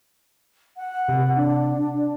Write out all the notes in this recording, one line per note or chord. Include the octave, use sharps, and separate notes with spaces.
F#5
C3
D4